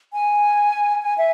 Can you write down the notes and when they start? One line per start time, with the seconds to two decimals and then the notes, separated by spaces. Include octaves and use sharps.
0.13 G#5
1.03 G#5
1.18 E5